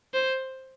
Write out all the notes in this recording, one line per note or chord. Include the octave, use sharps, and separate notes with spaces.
C5